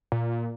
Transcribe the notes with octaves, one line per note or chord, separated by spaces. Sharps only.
A#2